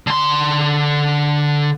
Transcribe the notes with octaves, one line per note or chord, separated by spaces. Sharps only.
D3 C6